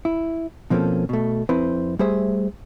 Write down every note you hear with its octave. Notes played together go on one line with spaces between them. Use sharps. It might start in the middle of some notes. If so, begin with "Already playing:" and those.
E4
B2 F3 A#3 C4 C#4 A4
B2 A3
F2 C4 E4 B4 C5
G3 A3 G#4 C5 E5